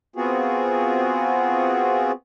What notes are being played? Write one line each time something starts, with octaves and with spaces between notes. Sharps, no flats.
B3 C4 F4 F#4 G#4